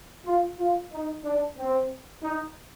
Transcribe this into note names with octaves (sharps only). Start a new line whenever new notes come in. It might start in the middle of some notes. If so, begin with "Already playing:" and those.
F4
F4
D#4
D4
C4
D#4